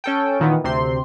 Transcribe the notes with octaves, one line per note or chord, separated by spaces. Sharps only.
C#4 A4 G5
A#2 D#3 E3 B3
D2 C3 C4 C6